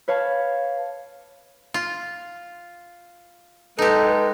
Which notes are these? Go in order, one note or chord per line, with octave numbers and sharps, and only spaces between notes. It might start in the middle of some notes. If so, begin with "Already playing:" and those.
B4 C#5 F5 A5
F4
G#3 D#4 G4 A4 B4